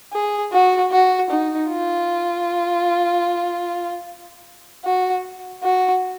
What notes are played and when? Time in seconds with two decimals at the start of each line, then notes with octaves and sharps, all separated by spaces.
0.13 G#4
0.52 F#4
0.92 F#4
1.30 D#4
1.70 F4
4.85 F#4
5.63 F#4